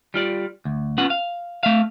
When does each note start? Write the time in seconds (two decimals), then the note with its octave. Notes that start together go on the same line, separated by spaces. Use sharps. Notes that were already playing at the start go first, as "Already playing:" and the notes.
0.14 G3 F4 D5
0.65 D2
0.98 B3 C#4 F4 F#5
1.10 F5
1.63 A3 E5 F5